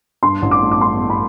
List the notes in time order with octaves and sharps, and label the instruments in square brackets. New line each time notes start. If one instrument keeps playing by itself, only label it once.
[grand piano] G2 [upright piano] C6
[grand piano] A1
[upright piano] D6
[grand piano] A3
[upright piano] D6
[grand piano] G2 [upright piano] C6
[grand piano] A3
[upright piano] B5